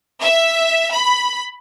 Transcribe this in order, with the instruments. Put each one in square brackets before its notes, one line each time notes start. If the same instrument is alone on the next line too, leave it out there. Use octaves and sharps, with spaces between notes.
[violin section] E5
B5